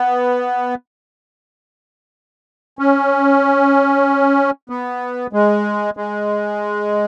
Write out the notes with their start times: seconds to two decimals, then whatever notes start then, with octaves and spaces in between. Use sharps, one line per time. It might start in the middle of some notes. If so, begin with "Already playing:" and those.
Already playing: B3
2.79 C#4
4.70 B3
5.33 G#3
5.97 G#3